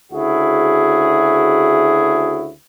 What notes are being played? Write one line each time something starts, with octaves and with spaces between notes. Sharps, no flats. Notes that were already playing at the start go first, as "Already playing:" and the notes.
D2 C#3 E4 F#4 G#4